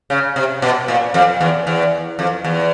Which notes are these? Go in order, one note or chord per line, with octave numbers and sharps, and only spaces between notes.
C#3
C3
B2
A#2
F2
E2
E2
F2
E2